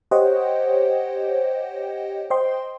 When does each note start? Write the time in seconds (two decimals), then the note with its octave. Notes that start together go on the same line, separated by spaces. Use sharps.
0.11 G4 C5 C#5 D#5 F#5 G5
2.30 C5 D#5 G5 C6